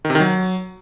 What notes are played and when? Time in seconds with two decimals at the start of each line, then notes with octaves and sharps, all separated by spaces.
0.05 D#3
0.10 C3
0.15 D#3
0.20 F#3